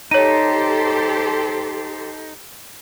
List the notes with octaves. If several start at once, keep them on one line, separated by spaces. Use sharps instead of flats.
D#4 G4 A4 C5 C#5 D#7